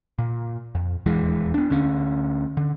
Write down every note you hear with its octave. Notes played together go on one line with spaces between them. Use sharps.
A#2
F2
D#1 E2 E3 G#3
B3 D4
D2 D3 C#4
D3